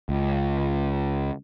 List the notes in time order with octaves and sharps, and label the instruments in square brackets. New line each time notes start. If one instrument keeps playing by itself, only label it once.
[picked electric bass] C#2